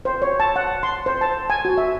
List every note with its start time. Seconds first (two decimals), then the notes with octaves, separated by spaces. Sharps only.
0.05 C5
0.22 C#5
0.40 A5
0.56 F#5
0.83 C6
1.06 C5
1.21 A5
1.50 G#5
1.65 F#4
1.78 E5